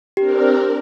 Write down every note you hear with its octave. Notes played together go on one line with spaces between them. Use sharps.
C4 D4 G4 A#4